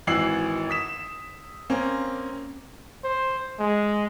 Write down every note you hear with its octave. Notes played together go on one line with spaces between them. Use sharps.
G#1 E3 F#4 E6 C7 F#7
D#6 B6 E7
A#3 C4 C#4
C5
G#3